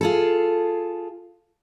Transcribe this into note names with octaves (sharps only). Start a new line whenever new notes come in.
F4 G#4 A4